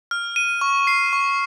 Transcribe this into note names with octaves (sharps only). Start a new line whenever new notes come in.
F6
D#7
C#6
C7
C#6